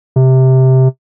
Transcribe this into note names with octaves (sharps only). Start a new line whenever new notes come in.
C3